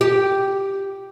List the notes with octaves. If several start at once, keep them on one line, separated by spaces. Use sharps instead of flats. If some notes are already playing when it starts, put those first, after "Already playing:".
G4